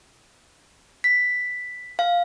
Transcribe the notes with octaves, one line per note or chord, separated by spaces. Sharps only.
B6
F5